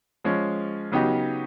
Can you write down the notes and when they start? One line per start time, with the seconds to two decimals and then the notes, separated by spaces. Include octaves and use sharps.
0.24 F3 G#3 C#4
0.92 C#3 F#3 B3 D#4 G4